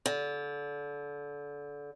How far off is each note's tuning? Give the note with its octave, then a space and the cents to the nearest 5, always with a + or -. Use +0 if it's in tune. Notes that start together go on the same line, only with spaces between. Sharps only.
D3 -25